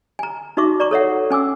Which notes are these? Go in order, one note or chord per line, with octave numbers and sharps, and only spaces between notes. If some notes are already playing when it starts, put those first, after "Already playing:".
G#5 A#5
D#4 F#4 E5 C#6 D6
D5 A#5 C#6
A4 C#5 E5 F#5
C#4 G#5 D6 E6